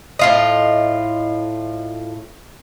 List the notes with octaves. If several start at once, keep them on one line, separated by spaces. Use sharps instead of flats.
A2 F4 D#5